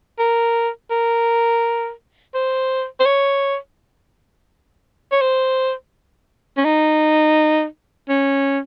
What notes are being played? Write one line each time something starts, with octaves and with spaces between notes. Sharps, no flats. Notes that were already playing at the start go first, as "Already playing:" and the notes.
A#4
A#4
C5
C5
C#5
C#5
C5
C#4
D#4
C#4